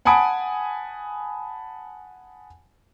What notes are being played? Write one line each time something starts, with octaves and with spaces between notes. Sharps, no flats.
F#5 G#5 A5 B5 D#6 D7